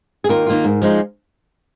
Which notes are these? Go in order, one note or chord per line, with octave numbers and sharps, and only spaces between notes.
G#4
D#2 F4 A#4
D#3 A#3 F4
G#2
F3 G#3 D#4